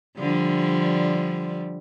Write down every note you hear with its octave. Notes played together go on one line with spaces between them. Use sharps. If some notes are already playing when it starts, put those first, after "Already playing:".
D3 F3 G3